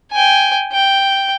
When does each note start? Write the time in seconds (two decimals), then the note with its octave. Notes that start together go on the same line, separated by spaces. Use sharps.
0.12 G5 G#5
0.73 G5